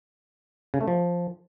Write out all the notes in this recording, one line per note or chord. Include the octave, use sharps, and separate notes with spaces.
C#3
A3
F3